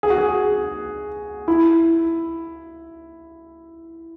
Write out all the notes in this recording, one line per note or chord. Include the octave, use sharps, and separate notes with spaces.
G#4
F#4
G#4
E4